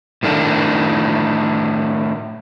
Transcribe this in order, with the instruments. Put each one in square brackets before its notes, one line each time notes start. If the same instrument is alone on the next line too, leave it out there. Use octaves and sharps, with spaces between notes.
[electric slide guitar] A2 D#3 A3 D4